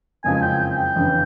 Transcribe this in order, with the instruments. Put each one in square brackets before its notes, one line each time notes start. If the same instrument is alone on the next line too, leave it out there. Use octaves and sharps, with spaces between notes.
[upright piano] F#1 F2 C#3 F3 G#3 [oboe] G#5
[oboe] G5
G5
G5
[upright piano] G1 F2 C#3 E3